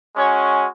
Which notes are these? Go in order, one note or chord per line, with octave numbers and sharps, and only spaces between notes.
G#3 C#4 F#4 C#5